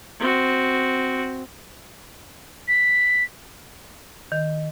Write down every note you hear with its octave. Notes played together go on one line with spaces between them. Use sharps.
C4 F#4
B6
D#3